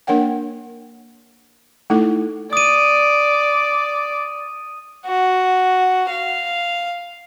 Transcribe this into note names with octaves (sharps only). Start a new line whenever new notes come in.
A#3 D4 A#4 C#5 F#5 G5
A3 D#4 E4 A4
D5 D#6 D#7
F#4
F5